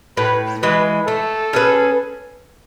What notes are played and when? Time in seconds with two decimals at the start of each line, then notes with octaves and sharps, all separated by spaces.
0.17 A2 B4
0.62 E3 G#3 B4
1.07 A3 A4
1.53 C#4 G#4 B4